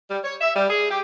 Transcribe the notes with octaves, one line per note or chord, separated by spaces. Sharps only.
G3
C#5
E5
G3
G#4
G4